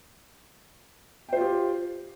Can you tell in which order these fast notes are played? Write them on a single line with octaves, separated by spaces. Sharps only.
G5 C5 F4 G4